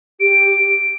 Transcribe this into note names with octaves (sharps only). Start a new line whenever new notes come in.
G4 D7